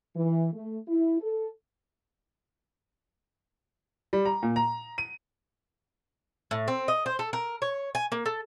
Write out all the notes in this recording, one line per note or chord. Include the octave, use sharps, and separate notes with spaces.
E3
A3
E4
A4
G3
A#5
A#2
A#5
D#7
A2
C4
D#5
C5
A4
A#4
C#5
G#5
A#3
A4